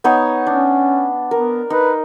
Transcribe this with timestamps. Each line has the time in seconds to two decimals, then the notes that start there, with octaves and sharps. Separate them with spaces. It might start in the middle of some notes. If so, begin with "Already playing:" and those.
0.04 B3 D#4 C#5
0.47 C#4 D4
1.31 B3 A#4
1.70 D#4 B4